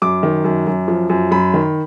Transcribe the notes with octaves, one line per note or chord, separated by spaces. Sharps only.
F#2 D6
D#3
F#2
F#2
F3
F#2
F#2 B5
D#3